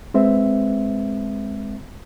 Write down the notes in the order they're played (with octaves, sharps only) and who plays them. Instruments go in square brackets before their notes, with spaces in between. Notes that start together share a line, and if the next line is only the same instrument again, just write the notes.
[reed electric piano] G#3 C4 B4 E5